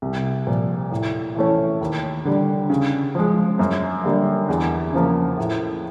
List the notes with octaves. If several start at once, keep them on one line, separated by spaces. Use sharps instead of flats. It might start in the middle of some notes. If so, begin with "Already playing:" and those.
C2
A#2 F3
A2
E3 A3 C#4
D#2
D3 G3
C#3
F3 G#3
F#2
D3 G3 A#3
E2
C#3 F3 A#3
A2